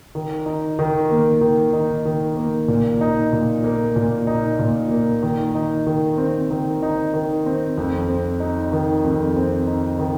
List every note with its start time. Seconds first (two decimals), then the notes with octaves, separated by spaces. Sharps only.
0.15 D#3
0.46 D#4
0.79 D#3
1.10 A#3
1.41 D#3
1.73 D#4
2.05 D#3
2.36 A#3
2.68 A#2
3.01 D#4
3.33 A#2
3.64 A#3
3.96 A#2
4.27 D#4
4.59 A#2
4.91 A#3
5.22 D#3
5.55 D#4
5.87 D#3
6.18 C4
6.50 D#3
6.82 D#4
7.13 D#3
7.46 C4
7.77 F2
8.08 C4
8.40 D#4
8.72 D#3
9.04 F2
9.36 C4
9.67 D#4
9.99 D#3